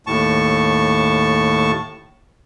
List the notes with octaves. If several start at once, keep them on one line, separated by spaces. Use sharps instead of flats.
D#2 A2 A5 C#6